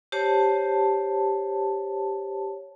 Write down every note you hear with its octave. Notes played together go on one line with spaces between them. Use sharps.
G4 C5 C#5 A5